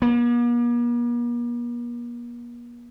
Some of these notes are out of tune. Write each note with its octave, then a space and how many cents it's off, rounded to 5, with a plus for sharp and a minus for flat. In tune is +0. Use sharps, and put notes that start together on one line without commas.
A#3 +45